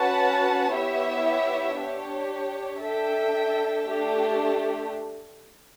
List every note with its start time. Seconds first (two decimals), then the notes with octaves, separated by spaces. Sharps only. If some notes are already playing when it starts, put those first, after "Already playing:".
Already playing: C#4 F#4 B4 F#5 A5
0.74 B3 E4 G4 C#5 E5
1.78 D4 G4 C#5
2.82 D4 A4 E5 G5
3.86 A3 D4 G4